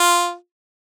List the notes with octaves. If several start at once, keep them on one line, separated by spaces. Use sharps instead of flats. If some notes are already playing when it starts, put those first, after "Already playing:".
Already playing: F4